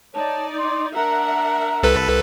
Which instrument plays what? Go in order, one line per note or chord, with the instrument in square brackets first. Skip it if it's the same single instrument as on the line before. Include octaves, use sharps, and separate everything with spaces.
[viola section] D#4 D5 [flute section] C#5 A5
[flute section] C6 D6
[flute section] D4 A#5 [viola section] A#4 E5 F#5
[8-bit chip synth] C2 A4 B4